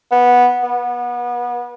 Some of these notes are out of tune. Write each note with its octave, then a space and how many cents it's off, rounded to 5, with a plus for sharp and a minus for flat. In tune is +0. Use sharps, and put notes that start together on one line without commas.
B3 -10
B3 -30